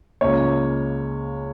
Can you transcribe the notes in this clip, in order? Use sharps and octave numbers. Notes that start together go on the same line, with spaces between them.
C#2 C#3 A#3 C#5